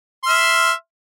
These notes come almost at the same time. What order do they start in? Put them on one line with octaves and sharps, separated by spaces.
C6 F6 E5